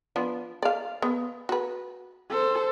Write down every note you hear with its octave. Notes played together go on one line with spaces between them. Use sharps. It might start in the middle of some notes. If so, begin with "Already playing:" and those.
F3 B3 D4
D5 F5
B3
F#4 B4
A4 C5